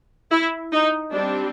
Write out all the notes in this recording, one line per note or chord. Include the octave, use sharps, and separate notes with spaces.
E4
D#4
G3 C4 D4